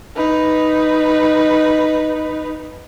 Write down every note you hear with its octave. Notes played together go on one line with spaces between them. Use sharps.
D#4 B4